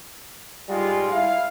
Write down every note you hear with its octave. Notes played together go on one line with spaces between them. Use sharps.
G#2 G3 G#3 F4
E4 F5